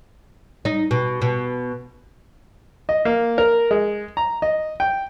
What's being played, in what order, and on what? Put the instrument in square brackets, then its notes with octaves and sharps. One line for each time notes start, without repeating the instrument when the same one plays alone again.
[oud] D#4
B2
B2
[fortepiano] D#5
A#3
A#4
G#3
A#5
D#5
G5